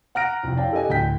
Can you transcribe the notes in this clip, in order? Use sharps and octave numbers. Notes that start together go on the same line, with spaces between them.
F#5 A#5 F6 F#6 A#6 D7
C2 F2
C#4 E4 D5 F5 G5 A5
G4 A4 D5 D#5 G#5
D1 D2 G5 G6 B6